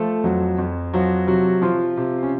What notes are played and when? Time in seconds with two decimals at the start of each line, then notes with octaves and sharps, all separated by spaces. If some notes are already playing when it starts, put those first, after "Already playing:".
Already playing: F3 A3 A4
0.24 F2 F#3 F#4
0.58 F2
0.93 F3 F#3 F#4
1.27 C3 F#3 F#4
1.62 F3 F4
1.97 C3
2.23 C#4